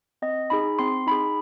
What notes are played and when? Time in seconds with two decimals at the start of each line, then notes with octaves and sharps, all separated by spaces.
0.22 C4 D#5
0.50 D#4 G#4 B5
0.79 C4 C6
1.07 D#4 G#4 B5